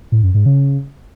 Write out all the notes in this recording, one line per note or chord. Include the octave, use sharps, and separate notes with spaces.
A2
F#2
G#2
C#3